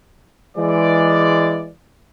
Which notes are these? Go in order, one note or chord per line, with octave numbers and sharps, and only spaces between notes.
E3 G#3 D5